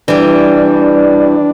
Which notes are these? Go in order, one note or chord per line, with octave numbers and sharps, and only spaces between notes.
E3 G3 D4